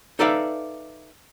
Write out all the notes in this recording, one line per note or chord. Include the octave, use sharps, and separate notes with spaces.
D#4 A4 B4 D5 E5 F5